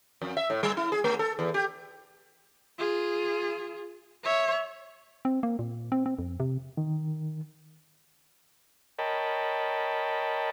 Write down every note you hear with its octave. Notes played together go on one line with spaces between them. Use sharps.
F2
E5
A2
G3
E4
G#4
A3
A4
E2
G4
F4 G#4
C#5 E5
C4
A#3
A#2
C4
C4
F2
C3
D#3
A#4 C#5 D#5 G5 A5 B5